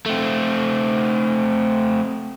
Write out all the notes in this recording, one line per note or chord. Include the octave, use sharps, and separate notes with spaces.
A3 C4